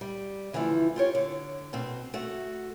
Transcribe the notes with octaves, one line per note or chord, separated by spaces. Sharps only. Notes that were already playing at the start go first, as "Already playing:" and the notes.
G3
D3 E3 F3 A3 E4
F4 G4 C#5
D3
B2 C4
A3 F#4